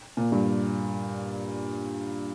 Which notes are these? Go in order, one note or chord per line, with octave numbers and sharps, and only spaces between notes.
A#2
G2